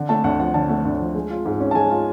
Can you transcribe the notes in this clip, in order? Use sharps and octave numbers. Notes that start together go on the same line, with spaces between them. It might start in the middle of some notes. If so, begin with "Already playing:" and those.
Already playing: D3
A3 A5
D2 F#5
F3 F#5
D3 A5
A3
D2
F3
G#3
F4
G#2
C#4
A5
G#3 G#5
F4